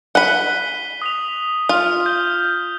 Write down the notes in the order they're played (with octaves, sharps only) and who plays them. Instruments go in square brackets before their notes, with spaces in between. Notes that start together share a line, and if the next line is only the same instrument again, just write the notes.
[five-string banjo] F#5 B5 [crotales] B6 D#7 G7
[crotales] D#6 B6 F7
[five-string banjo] F4 [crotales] F6
[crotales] G6 G7